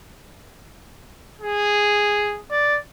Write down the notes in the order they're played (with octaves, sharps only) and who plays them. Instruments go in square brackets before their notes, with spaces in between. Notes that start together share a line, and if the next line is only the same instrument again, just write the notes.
[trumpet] G#4
D5